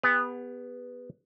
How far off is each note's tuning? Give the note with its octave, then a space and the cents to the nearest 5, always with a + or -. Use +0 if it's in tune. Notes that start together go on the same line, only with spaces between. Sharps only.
B3 +0 G4 +45